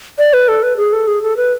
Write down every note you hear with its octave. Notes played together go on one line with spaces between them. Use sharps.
D5
B4
A4
B4
G#4
A4
G#4
A4
B4